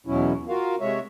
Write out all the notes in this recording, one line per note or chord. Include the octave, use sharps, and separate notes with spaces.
E2 B2 F#3 C#4 E4
F4 F#4 A#4 F5
C3 G#3 C#5 E5